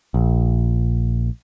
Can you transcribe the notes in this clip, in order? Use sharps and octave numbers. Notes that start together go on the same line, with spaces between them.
A#1